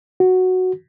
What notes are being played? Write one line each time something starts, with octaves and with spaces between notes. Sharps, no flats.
F#4